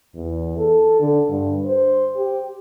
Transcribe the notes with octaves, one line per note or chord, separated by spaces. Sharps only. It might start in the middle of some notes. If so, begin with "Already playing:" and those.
E2
A4
D3
G2
C5
G4